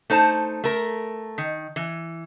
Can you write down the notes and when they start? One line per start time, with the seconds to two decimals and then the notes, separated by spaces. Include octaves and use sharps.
0.10 A3 D#4 C5 A5
0.64 A3 A#4
1.38 D#3
1.76 E3